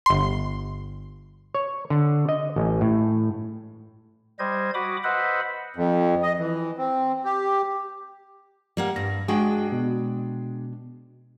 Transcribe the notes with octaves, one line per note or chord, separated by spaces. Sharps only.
G1 C6
C#5
D3
D#5
A1
A2
G3 C5 D#5 G#6
F#4 B5 D6 D#6
B4 C5 D#5 E5 F#5 B5
F2
D#5
E3
C4
G4
G3 A#3 F#5
G2 A#6
G#3 D4 F#4 G#4 G5
B2